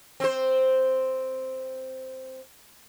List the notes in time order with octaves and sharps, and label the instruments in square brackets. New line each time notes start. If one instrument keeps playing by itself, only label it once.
[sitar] C4 C5